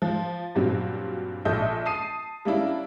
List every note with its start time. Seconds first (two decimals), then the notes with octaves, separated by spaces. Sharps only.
0.02 F3
0.55 G2 A#2 F#3 G3 C4
1.45 A#1 A4 D#5 E5 G6
1.86 A5 D#6 C7 D#7
2.45 G3 A#3 C#4 D4 E4